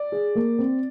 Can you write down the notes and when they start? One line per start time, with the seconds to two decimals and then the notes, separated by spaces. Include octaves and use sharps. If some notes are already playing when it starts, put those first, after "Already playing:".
Already playing: D5
0.12 G#4
0.35 A#3
0.59 C4